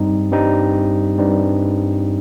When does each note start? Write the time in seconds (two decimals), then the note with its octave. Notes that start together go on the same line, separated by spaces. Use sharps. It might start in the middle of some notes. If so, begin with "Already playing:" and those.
Already playing: G2 G3 C4 D#4
0.31 G2 G3 C4 D#4
1.18 G2 G3 C4 D#4